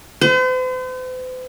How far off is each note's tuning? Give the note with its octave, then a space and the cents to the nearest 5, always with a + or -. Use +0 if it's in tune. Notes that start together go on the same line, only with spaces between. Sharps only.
C5 -45